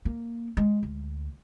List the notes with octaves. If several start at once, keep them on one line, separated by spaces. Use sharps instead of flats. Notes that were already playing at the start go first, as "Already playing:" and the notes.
A#3
G#3
D2